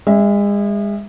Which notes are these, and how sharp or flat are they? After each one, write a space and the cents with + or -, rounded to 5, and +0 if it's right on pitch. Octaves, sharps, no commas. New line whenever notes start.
G#3 -35 E5 +0